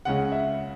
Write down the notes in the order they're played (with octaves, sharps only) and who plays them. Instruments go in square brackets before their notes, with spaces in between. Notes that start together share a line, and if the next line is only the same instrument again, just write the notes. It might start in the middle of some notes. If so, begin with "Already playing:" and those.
[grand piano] C#2 C#3 G#3 C#4 F#5
E5